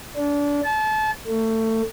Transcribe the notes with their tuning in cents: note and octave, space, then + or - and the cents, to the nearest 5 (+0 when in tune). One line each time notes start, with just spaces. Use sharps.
D4 -25
A5 -30
A3 +25